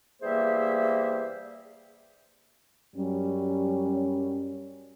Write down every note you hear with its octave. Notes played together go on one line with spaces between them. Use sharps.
E2 G3 A#3 G#4 C5 E5
F#2 F#3 G3 C#4